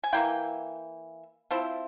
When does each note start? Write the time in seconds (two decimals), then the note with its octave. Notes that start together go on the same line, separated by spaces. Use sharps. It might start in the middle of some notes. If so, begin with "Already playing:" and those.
0.04 G#5
0.13 E3 A#3 E4 G5
1.51 F3 C4 E4